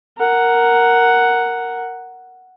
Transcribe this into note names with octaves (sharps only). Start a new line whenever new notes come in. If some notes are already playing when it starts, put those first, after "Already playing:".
A#4 F#5